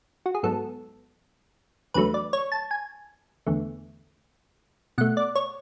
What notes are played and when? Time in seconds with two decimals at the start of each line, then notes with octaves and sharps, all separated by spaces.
0.26 F#4
0.35 G#4
0.43 G#2 F#3 B3 A4
1.94 E2 D3 F#3 A3 B4
2.14 D5
2.33 C#5
2.52 A5
2.71 G#5
3.47 E2 D3 A3
4.98 B2 A3 F#5
5.17 D5
5.35 C#5